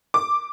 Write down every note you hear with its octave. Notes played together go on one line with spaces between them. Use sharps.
D6